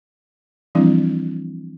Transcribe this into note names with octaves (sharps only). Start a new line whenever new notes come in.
E3 F3 G3 C4 D4 E4